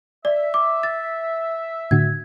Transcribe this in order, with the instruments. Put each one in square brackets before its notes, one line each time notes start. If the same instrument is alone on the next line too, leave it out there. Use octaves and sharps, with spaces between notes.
[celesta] D5 [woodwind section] E5
[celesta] D6
A6
[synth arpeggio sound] A2 D3 F#4 [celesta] G#6